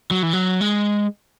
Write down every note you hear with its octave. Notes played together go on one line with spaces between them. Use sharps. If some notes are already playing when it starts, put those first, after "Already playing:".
F#3
E3
F#3
G#3